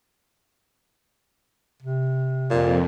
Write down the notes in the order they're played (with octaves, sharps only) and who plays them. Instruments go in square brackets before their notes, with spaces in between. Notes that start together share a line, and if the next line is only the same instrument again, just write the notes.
[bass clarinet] C3
[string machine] F2 [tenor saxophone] A#2